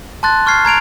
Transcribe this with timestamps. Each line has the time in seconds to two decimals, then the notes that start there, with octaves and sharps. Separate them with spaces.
0.23 A5 C6 F#6 A6
0.46 C#6 F6 G#6 C7
0.65 A#5 G#6 D7 F7